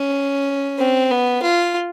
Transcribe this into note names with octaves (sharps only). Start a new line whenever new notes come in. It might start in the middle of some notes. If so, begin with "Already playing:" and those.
Already playing: C#4
C4
B3
F4